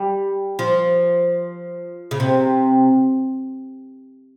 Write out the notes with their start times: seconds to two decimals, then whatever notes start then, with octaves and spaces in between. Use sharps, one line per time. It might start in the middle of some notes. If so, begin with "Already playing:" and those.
Already playing: G3
0.59 F3
2.11 C#3
2.20 C3